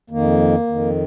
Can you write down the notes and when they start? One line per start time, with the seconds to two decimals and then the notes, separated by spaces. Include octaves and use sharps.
0.10 F2 D#3 A#3
0.67 F2 D#3